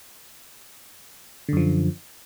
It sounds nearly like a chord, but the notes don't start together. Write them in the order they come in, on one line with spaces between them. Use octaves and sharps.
D3 F#2 F3